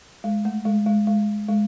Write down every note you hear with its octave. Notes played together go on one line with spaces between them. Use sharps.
G#3
A3
G#3
G#3
G#3
G#3